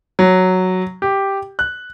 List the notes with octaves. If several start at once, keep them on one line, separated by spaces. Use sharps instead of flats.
F#3
G4
F#6